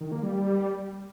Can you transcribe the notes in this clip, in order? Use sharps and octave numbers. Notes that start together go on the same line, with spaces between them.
D#3
A#3
G3